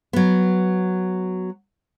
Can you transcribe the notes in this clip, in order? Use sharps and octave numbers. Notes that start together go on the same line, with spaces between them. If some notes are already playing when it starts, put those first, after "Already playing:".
F#3 B3